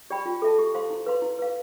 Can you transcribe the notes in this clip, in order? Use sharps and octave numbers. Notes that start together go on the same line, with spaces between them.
G4 D5 G5 B5
F4
A4 E5 A5
G4
C5 F5 C6
E4
B4 F5 C6
E4
B4 F5